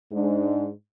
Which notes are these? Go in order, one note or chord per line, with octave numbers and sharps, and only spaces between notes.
G#2 G#3 D4